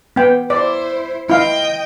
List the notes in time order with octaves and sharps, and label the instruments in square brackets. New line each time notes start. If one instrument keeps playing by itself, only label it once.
[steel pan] B3 G5
[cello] E4 C5 [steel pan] D5
[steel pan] E4 F5 [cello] D#5 G5